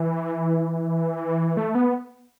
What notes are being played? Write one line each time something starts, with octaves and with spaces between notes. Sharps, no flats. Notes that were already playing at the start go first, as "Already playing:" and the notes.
Already playing: E3
A3
B3